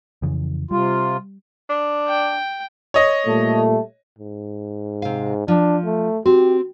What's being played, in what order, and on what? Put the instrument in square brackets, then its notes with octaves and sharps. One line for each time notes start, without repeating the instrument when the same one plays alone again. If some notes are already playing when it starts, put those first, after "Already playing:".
[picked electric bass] F2 C#3 E3
[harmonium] C3 F4 [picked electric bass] G3
[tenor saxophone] D4
[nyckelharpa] G5
[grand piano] C#5 D#5
[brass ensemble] A#2 G3 A3
[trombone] G#2
[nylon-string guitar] C3 F5
[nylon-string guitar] F3 [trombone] D4
[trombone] A3
[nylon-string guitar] C4 [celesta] F#4 [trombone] G4